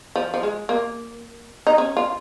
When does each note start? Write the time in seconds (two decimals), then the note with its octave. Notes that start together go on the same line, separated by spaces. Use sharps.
0.16 F3
0.34 F3
0.43 G#3
0.69 A#3
1.67 D#4
1.78 C#4
1.97 F4